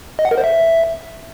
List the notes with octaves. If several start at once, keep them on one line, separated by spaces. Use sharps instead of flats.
D#5
F#5
A#4
C5
E5